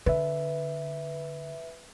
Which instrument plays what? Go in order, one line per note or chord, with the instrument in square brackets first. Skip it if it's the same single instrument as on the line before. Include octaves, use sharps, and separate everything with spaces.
[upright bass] D3 [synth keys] B4 E5